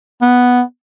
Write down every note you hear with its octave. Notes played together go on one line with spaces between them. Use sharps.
B3